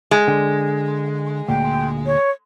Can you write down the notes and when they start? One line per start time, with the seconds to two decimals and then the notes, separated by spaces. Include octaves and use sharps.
0.11 G#3
0.28 D3 G5
1.48 D2 A#2 G5
2.06 C#5